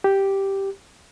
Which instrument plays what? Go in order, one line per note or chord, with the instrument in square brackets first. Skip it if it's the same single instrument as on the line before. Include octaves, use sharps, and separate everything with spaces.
[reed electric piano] G4